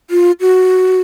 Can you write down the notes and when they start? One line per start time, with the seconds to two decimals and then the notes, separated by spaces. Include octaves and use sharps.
0.10 F4
0.41 F#4